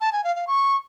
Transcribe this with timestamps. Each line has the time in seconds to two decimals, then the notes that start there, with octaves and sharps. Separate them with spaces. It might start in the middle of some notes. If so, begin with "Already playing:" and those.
0.01 A5
0.12 G#5
0.24 F5
0.36 F5
0.47 C#6